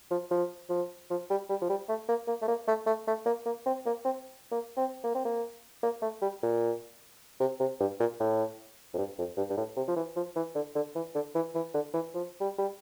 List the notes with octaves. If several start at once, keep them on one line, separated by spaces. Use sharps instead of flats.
F3
F3
F3
F3
G3
G3
F3
G3
A3
A#3
A#3
A3
A#3
A3
A3
A3
A#3
A#3
C4
A#3
C4
A#3
C4
A#3
C4
A#3
A#3
A3
G3
A#2
C3
C3
G2
A#2
A2
F2
G2
F2
G2
G2
A2
C3
F3
E3
F3
E3
D3
D3
E3
D3
E3
E3
D3
E3
F3
G3
G3